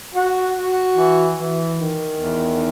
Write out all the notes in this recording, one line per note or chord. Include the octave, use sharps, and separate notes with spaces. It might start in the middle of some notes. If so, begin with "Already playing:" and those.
F#4
F#4
E3
E3
D#3
E2